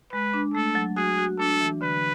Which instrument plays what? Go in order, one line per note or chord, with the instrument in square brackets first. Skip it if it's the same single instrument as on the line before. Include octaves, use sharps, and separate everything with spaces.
[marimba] G#3 [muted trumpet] B4
[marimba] D4
[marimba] A3 [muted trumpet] A4
[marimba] F#3
[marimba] F#4 [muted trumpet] G#4
[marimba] F#4
[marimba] D4 [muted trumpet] A4
[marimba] E3
[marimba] D3 [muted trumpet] B4